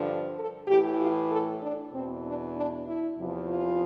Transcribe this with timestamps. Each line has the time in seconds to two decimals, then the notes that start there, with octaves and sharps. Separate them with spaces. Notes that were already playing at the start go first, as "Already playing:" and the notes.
Already playing: G2 D3 F3
0.37 A4
0.67 A2 E3 G4
1.00 F4
1.30 A4
1.61 D4
1.92 E2 B2 C4
2.24 D4
2.56 D4
2.86 E4
3.18 E2 C3 F3
3.49 F4